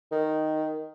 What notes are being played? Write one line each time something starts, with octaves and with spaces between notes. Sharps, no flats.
D#3